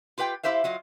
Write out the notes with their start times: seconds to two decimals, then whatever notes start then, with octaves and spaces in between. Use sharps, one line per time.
0.18 F4 G4 B4 F#5 G5
0.43 E4 G4 C5 E5 F5
0.64 F#3 F4 D#5